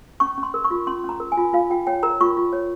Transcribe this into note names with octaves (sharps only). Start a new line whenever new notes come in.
C#4 C#6
C#4
C6
A#4
C#6
F4
C#4 C6
C#4 A#5
A#4
G#5
F4
F4 F5
F4 G5
C#5 G5
A#4 A#5
F4 C#6
F4
C#5